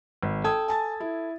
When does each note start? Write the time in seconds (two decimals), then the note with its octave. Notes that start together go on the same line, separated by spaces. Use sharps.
0.23 G#1
0.44 A4 G5 D#6 G#6
0.68 G#5 A5 A6
1.00 E4